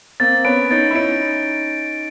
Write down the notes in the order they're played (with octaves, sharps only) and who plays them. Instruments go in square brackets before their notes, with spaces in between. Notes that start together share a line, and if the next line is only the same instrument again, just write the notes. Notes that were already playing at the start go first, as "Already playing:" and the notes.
[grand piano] A#3 C4 [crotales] A6
[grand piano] B3 C#4 [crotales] D7
[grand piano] C#4 D#4 [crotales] A6
[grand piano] E4
[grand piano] C#4 D#4 [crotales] D7